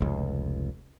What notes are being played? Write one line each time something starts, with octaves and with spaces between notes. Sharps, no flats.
F1 C#2